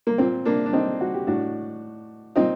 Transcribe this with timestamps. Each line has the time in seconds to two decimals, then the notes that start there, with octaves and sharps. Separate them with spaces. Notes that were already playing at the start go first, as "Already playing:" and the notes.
0.07 A#3
0.18 A#2 C4
0.45 A#3 D4
0.66 D4
0.73 C4 D#4
1.01 F#4
1.14 G4
1.27 A2 D4 F#4
2.36 A#2 C4 D#4